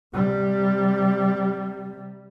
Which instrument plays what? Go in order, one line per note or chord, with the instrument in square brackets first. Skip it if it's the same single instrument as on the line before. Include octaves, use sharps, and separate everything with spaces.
[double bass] C3 G3